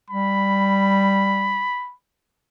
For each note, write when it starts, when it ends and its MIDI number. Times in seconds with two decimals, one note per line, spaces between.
0.11 1.65 55
0.11 1.93 83